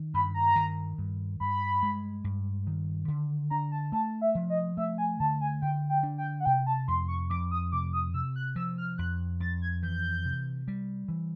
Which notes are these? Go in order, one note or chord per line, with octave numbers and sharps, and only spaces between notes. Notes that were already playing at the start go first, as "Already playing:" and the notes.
Already playing: D#3
G2 B5
A#5
D#3
G2
G2 B5
G#3
G2
D#3
D3
D4 A#5
A5
A3 A5
E5
F3
D#5
A3 E5
G#5
D3 A5
G#5
D3 G5
G5
D4
G5
F#5
C3 G5
A5
F2 C6
C#6
F2 D6
D#6
C3 D6
D#6
C3 E6
F#6
F3 E6
F6
F2 F#6
F2 A6
G#6
E3 G6
C3
G3
E3